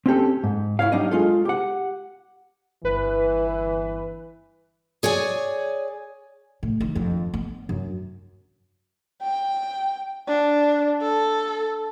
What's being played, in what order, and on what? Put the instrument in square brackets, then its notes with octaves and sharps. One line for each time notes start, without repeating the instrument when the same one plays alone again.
[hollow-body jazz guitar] C4 C#4 G4 A4
G#2
E4 C#5 F5
F#3 G3 D4 D#4 D#5
G#3 F4 A4
G4 F#5
[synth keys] G1 B4 [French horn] E3
[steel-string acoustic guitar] G#4 C#5 D5 G#5
[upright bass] A2
D#3
F2
B3
F#2
[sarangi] G5
D4
A4